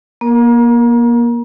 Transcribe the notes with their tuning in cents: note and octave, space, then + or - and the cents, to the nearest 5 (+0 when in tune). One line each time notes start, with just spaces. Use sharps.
A#3 +35 A#4 +0